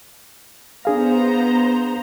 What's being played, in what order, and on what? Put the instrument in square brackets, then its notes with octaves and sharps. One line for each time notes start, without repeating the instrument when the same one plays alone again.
[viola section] B3 C5 A#5 [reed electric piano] D4 G#4 F5